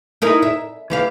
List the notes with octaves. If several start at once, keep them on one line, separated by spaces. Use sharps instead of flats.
D#4 E4 A#4
E5
E3 G4 F5